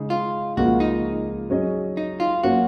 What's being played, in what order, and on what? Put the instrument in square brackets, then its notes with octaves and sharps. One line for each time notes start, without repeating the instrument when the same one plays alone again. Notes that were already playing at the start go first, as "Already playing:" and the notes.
Already playing: [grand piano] C#3 G#3 D#4 G#4
[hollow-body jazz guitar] F4
[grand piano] C#2 C#3 F3 A#3 F4 [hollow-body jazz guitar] F#4
[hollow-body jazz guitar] D#4
[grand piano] F#3 C#4 G#4 D#5
[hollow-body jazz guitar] D#4
F4
[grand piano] F#3 A#3 C#4 [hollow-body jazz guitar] F#4